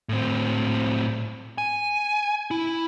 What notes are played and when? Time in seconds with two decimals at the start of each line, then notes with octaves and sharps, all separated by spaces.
0.09 A2 C4
1.58 G#5
2.51 E4